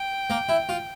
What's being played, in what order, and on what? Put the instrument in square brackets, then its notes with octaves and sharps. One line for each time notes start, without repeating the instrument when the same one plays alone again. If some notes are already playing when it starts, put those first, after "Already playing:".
Already playing: [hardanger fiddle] G5
[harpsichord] A#3
E4
F4